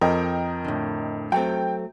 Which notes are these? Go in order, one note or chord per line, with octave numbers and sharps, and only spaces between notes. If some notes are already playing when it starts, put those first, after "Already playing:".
F2 A#4 D#5 G5
A2 D3
F#3 A3 C4 G5